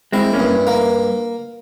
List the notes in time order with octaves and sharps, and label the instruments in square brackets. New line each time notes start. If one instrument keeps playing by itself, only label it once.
[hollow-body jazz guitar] G#3 C4 [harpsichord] E4
[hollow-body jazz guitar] A#3 C#4
[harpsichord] G2
A#3